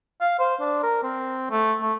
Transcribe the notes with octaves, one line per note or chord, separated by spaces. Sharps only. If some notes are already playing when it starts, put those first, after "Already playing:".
F5
C5
D4
A#4
C4
A3
A3